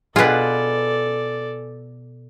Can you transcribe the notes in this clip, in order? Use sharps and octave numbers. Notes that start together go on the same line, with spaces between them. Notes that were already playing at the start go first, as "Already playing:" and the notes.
B2 F4 G#4 A4 B4 D5